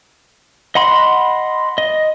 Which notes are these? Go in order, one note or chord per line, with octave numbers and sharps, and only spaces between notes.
D#5 F#5 B5 C6
D#5